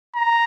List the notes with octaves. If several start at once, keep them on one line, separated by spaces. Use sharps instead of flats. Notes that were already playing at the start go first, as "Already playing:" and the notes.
A#5